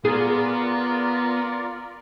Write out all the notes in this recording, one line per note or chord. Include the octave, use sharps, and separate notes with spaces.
B3 F4 G#4 A#4 D5